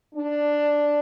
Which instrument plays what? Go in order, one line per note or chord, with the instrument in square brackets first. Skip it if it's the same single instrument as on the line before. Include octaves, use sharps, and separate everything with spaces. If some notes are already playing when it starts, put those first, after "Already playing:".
[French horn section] D4